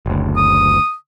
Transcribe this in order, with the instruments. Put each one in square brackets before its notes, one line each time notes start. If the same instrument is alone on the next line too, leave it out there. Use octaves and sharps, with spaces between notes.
[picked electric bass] F#1 D2
[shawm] D#6